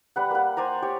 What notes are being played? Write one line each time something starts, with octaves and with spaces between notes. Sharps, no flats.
G3 B4 F#5
A#3 F#5
C5 D5 G#5 A#5
G4 C#5